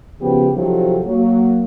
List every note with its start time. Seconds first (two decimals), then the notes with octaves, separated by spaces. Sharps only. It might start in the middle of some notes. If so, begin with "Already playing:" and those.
0.21 C#3 F3 B3 F#4 G4
0.53 C3 D#3 F3 F#3 G4 A4
1.05 F#3 A#3